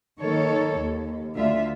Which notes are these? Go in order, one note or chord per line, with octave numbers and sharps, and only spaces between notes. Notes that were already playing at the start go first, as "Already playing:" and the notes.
D#3 A#3 A4 C#5
D#2
D2 D3 A3 F4 E5